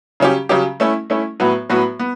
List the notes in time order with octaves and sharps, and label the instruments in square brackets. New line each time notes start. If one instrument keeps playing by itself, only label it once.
[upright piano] C#3 F#3 C#4 G4
C#3 F#3 C#4 G4
A3 C#4 E4
A3 C#4 E4
A2 F#3 B3 F#4 B4
A2 F#3 B3 F#4 B4
B3